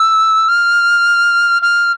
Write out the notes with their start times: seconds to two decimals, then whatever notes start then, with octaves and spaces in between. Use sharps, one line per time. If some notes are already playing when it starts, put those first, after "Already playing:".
Already playing: E6
0.48 F6
1.62 F6